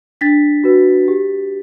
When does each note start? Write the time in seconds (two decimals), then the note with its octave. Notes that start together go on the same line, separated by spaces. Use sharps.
0.21 D4 A6 B6
0.64 F#4 B4
1.08 G4